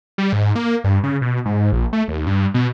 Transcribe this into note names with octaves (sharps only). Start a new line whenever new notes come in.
G3
G#2
A#3
G2
C#3
B2
G#2
A#1
A3
D#2
G2
B2